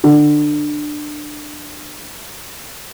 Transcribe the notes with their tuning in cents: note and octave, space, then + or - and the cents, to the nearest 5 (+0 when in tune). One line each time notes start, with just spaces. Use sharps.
D3 +25